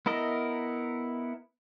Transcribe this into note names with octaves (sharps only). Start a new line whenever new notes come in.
B3 E4 A#4 D#5